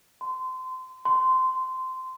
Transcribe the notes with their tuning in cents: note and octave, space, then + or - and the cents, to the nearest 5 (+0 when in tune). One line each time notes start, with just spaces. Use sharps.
C6 -25
C6 -15